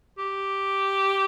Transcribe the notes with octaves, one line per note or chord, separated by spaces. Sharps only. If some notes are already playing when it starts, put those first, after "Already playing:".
G4